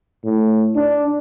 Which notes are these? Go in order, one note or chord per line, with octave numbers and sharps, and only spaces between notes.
A2
D4